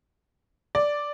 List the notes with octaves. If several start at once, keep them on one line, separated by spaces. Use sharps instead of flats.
D5